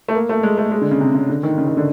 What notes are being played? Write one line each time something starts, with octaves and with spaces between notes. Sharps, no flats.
A3
A#3
A3
G#3
A3
G#3
D3
C#3
C3
C#3
D3
D#3
C#3
D#3
D3